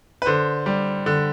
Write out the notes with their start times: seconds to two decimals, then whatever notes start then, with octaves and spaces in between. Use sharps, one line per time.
0.22 B4
0.26 D3 C5
0.66 G3
1.06 D3